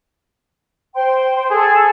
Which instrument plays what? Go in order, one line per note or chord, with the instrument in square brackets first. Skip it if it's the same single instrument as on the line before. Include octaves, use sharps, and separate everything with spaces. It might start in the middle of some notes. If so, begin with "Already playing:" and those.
[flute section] C5 G5 C6
[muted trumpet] G#4 [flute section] A4